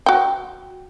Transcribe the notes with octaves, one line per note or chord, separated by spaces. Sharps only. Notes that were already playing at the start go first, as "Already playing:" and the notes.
F#4 G5